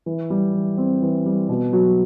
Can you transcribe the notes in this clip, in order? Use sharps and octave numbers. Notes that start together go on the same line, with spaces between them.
E3
G3
E3
C4
E3
G3
B2
F#3